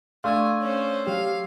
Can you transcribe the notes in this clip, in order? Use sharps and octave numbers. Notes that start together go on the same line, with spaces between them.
A3 D4 F5 G#5 C6 E6 G#6
C#4 C5
F#3 G4 F5